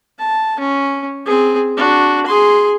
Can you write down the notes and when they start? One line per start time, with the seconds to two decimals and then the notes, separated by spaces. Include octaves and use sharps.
0.19 A5
0.60 C#4
1.25 C4 G#4
1.77 D4 F#4
2.26 G#4 C6